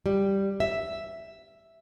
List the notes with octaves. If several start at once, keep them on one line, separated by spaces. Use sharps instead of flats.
G3
E5